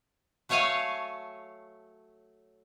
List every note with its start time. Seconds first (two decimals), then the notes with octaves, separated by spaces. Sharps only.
0.49 F#3 A3 C#5 F5 G#5 A5